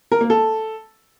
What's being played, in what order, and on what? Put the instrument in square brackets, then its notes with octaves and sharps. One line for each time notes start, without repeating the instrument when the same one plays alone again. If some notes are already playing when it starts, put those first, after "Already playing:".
[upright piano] A#4
A#3
A4